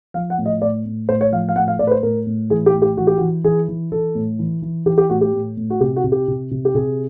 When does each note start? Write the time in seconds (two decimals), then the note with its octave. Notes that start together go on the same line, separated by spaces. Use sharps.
0.14 F3 F5
0.30 F#5
0.38 A2
0.46 D#5
0.62 A2 D5
0.85 A2
1.09 A2 C5
1.21 C#5
1.32 F3 F5
1.49 F5
1.56 A2 F#5
1.68 F5
1.79 A2 D5
1.87 B4
1.91 C5
2.03 A2 A#4
2.27 A2
2.50 E3 G#4
2.66 G4
2.74 A2
2.82 G4
2.97 E3 F#4
3.07 G4
3.18 E3 F#4
3.44 E3 G#4
3.68 E3
3.92 E3 A4
4.15 A2
4.39 E3
4.62 E3
4.86 E3 G4
4.98 G4
5.10 A2 F#4
5.21 G4
5.33 A2
5.57 A2
5.70 F#4
5.80 C3 G4
5.96 F#4
6.04 C3
6.12 G4
6.28 C3
6.51 C3
6.65 G4
6.75 C3 G#4